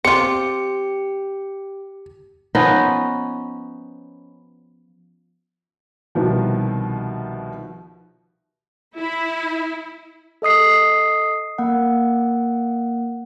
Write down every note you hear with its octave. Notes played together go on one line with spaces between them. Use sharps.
C4 F4 G4 C#7
F3 B3 C#4 D#4
C2 B2 D#3 F3
E4
A4 D#5 D#6 C7
A#3 F#5